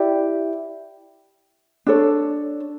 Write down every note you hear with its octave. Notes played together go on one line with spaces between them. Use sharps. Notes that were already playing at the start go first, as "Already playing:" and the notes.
Already playing: E4 G4 D5
D4 A4 C#5